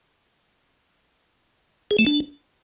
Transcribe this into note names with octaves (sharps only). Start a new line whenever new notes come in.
G#4
A3
D4